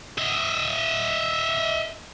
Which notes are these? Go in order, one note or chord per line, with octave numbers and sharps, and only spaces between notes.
D#5 E5